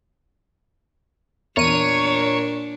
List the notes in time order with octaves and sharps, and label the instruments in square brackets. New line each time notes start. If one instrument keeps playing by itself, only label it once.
[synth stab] E2 D#7 [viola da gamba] A#2 D4 [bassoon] A#4 [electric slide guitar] C#5